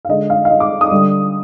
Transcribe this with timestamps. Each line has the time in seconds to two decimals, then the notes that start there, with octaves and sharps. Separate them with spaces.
0.05 F5
0.09 D3 G#3 D#5
0.30 F5
0.45 F5
0.50 D#5
0.60 D6
0.81 D#6
0.91 D3 G3